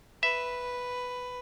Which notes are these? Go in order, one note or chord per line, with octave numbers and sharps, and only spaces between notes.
B4 E5